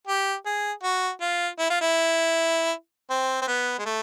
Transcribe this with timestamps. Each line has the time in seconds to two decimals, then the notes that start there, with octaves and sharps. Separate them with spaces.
0.07 G4
0.46 G#4
0.83 F#4
1.21 F4
1.59 E4
1.70 F4
1.81 E4
3.10 C4
3.42 C4
3.48 B3
3.79 G#3
3.86 A3